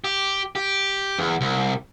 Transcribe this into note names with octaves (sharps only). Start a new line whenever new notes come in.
G4
G4
E2
C2